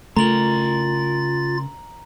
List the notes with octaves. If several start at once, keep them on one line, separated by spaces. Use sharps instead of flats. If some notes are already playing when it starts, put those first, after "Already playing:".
C#3 A3 F4 A#4 A#5 A6 F#7